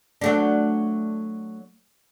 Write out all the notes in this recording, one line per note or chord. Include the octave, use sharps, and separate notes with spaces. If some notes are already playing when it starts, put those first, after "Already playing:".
F#3 A3 D4